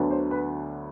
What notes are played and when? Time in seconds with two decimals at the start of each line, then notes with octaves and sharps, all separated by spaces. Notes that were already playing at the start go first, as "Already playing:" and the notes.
Already playing: D2 D3 F#3 B3 D4
0.11 C5
0.31 B4